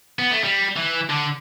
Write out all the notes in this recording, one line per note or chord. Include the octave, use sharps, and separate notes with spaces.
B3
A3
G3
E3
D3